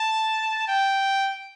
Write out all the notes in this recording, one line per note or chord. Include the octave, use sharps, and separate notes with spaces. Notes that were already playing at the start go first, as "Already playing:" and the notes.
Already playing: A5
G5